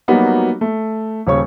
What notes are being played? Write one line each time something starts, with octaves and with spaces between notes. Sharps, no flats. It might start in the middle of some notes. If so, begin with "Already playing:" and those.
F#3 G3 A#3 B3 D#4 F#4
A3
D#1 C#3 C#5 C#6